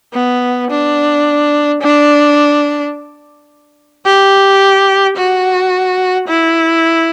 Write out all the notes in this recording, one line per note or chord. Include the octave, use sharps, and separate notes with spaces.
B3
D4
D4
G4
F#4
E4